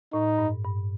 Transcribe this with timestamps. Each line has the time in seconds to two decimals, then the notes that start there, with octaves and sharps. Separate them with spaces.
0.13 A2 D#4
0.38 G2
0.64 G2